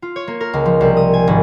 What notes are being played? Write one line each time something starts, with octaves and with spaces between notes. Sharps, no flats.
F4
C#5
A#3
A#4
C#2
F3
C2
D#6
G#5
G#1